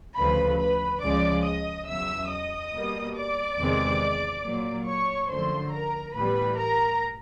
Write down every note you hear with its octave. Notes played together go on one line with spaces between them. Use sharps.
D2 C#3 F3 B4 B5
B4 B5
C#2 C#3 F3 G#3 D5 D6
D#5 D#6
E2 C#3 F#3 E5 E6
D#5 D#6
B2 G3 A#3
D5 D6
E2 C3 D#3 G#3 C4
A#2 F#3 A#3
C#5 C#6
F#2 D3 F3 A3 C5 C6
A#4 A#5
A2 E3 G3 B3 B4 B5
A#4 A#5